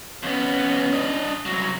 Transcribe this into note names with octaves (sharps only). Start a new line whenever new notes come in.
F2 B3 C#4
D4 D#5
C2 F#3